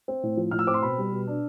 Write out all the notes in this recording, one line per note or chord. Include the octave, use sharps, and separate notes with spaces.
C4
A2
F3
A2 F6
E6
C4 D6
C6
B2 B5
G3
B2
D4